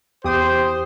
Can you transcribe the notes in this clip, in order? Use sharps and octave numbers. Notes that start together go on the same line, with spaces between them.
E2 G4 C5 G5 D6 D#6